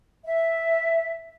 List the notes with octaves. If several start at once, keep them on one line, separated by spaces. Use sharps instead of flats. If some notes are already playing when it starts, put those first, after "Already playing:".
E5